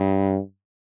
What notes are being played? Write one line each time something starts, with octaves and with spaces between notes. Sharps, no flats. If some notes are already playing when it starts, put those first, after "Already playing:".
Already playing: G2